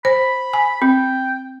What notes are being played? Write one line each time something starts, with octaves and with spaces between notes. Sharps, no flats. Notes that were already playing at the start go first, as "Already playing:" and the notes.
C5 B5
G#5
C4 G5